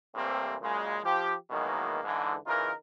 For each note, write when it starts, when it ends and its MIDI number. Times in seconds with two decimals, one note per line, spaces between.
0.15 0.56 45
0.15 0.56 48
0.15 0.56 52
0.15 0.56 55
0.15 0.56 58
0.15 0.56 60
0.60 0.97 42
0.60 0.97 46
0.60 0.97 49
0.60 0.97 56
1.03 1.33 53
1.03 1.33 67
1.50 1.99 47
1.50 1.99 51
1.50 1.99 52
1.50 1.99 54
1.50 1.99 56
1.50 1.99 58
2.04 2.34 44
2.04 2.34 50
2.04 2.34 52
2.47 2.71 49
2.47 2.71 52
2.47 2.71 63
2.47 2.71 65
2.47 2.71 70